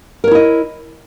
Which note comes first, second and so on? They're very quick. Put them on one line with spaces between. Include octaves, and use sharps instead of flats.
A#4 C#5 E4 D#5